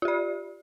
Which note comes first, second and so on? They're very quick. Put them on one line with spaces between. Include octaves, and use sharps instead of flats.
F4 G4 D5